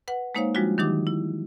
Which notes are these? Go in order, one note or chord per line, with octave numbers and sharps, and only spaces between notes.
B4 F#5
G#3 A#3 D#4 C5 C#5 F5
F3 G3 G#3 D4 F4 F#4
D#3 E3 F#3 D#4 G4 D6
E4